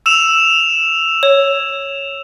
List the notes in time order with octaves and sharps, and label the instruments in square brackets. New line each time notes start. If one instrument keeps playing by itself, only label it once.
[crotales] E6 E7 F7
[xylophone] C#5